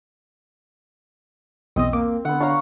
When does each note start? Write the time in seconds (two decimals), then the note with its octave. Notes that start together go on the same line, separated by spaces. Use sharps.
1.76 B1 E2 C4 D#5 D#6
1.93 A#3 D6
2.25 D3 B3 F#5
2.40 D4 C#5 F5 A#5